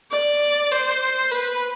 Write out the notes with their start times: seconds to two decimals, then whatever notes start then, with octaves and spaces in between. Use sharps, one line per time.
0.12 D5
0.71 C5
1.31 B4